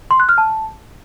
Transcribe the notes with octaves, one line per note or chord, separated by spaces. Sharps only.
C6
F#6
F6
A5